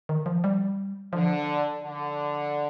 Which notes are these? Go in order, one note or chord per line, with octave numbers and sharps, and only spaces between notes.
D#3
F3
G3
D3 F3
D3